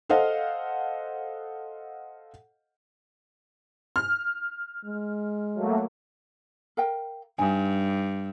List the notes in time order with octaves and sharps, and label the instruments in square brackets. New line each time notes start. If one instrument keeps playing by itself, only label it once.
[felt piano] A4 C5 D#5 F5 F#5
[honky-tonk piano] F6
[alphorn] G#3
[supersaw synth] F#3 A3 A#3
[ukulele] A#4 F5 G5
[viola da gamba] G2 [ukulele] D#4 G#5